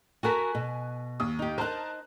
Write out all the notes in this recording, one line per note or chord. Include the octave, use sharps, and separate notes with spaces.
F#4 A4 A#4 G#5 F#6 B6
B2
D#2 D#6
D#4 G4
D#4 A#4 C5 A5 F#6